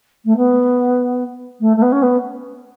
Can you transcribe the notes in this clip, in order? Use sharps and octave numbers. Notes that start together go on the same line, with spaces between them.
A3
B3
A3
A3
B3
C#4
B3